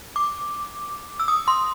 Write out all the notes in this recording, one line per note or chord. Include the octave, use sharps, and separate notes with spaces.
D6
E6
D#6
C6